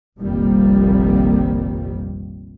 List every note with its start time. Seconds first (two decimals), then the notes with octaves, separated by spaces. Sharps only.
0.19 F1 A#1 F2 D#3 G3 A#3